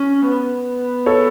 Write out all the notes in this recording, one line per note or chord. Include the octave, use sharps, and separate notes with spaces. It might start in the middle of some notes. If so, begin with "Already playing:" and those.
Already playing: C#4
B3
A4 C#5